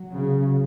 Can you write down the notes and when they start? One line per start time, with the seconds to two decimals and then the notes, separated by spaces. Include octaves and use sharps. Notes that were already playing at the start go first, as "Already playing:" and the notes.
Already playing: F#3
0.11 C#3